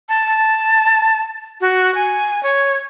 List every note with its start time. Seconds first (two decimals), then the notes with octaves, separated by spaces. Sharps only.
0.09 A5
1.61 F#4
1.95 G#5
2.43 C#5